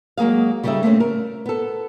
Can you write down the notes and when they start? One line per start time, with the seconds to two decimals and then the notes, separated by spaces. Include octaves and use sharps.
0.17 F#3 G#3 A#3 G#4 F5
0.63 C#3 G3 D#4 G#4 A4 E5
0.83 A3 A#3 C4 C#4
1.00 A#4
1.46 B3 A4